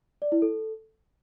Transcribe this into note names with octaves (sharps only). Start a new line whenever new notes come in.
D5
E4
A4